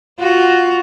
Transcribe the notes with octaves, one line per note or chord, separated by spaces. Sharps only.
F4 F#4